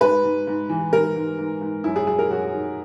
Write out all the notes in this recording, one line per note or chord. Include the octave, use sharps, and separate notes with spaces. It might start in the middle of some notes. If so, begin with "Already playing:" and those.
G#2 B4
G#2
G#2
E3
G#2 A#4
G#2
G#2
G#2
F#2 E4
G#4
F#3 G#4
A#4
F#2 F#4
D#3